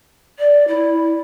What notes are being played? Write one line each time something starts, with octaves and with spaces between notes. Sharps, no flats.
D5
E4